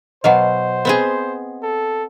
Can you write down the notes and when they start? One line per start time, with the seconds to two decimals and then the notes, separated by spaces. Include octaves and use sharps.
0.24 B2 F#3 C5 D#5 F5 F#5
0.85 B3 C4 G#4
1.63 A4